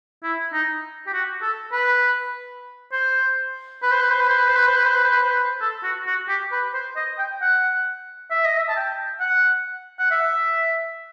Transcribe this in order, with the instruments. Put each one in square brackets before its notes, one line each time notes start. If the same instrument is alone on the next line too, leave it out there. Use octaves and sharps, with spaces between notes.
[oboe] E4
D#4
G4
F#4
A4
B4
C5
B4
C5
B4
C5
B4
C5
B4
C5
B4
C5
B4
C5
B4
C5
B4
C5
B4
A4
F#4
F#4
G4
B4
C5
D#5
G5
F#5
E5
D#5
E5
A5
G5
F#5
F#5
E5